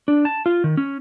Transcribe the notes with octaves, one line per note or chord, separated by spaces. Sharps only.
D4
A5
F4
D#3
C#4